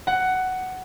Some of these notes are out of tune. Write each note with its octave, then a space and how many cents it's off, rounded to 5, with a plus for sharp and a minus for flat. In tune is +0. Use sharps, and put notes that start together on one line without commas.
F#5 +10